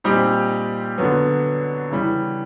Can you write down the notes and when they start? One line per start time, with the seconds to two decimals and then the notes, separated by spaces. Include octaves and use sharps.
0.04 A#2 G3 C4 D#4 G4
0.98 D3 F#3 B3
1.90 C#3 E3 G3